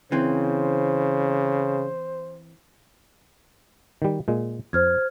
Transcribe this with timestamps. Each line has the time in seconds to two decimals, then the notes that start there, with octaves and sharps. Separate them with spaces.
0.12 C#3 E3 C4 C5
4.02 D#3 G3
4.28 A#2 G#3
4.73 F2 C5 F6 G#6